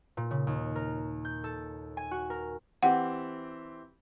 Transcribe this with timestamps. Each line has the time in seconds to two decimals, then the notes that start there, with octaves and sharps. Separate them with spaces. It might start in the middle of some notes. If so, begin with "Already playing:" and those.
0.17 A#2
0.31 C#3
0.47 D#2
0.75 A#4
1.25 G6
1.44 A4
1.97 G#5
2.11 F#4
2.30 A#4
2.83 E3 C4 G4 F#5